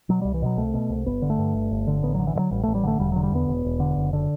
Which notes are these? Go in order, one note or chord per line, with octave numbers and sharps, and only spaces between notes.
B2 F#3
C2 G3
E3
B2 F#3
C2 A3
B2
C2
G1 B3
D3
A3
G2
G1
G1
D3
A1 B3
D3 F#3
E3
G2
F#3
A1 G3
A1 A3
G3
D3 A3
E1 G3
D3 F#3
G3
E2 B3
E1
E1
D3
F#1
D3